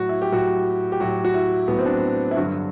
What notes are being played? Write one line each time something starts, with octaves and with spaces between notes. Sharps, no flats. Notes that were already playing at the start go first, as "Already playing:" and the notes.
Already playing: A2 F#3 F#4
E4
G4
A2 F#3 F#4
G4
A2 F#3 F#4
F#4
E4
A2 F#3 B3
C4
D4
E4
G2 D3 F#3 F#4